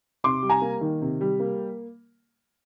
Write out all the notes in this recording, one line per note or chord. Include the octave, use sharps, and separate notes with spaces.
C3 C6 D6
G3
G#5 A#5
A#3
D#3
C3
G3
A#3